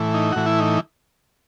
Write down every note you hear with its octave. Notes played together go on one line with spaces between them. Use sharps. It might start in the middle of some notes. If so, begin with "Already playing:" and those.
Already playing: A2 E3
D#4
A2 E3 F#4
E4
D#4